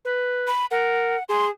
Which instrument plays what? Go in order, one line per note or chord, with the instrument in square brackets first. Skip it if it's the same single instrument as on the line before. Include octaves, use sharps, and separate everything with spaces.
[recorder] B4
[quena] B5
[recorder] A#4 [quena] F#5
[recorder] G#4 [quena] C6